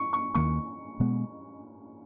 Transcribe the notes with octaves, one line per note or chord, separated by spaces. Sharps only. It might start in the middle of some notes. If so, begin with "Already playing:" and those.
Already playing: C#6
C#6
D#2 D#3 A#3 C#6
B2 G#3 B3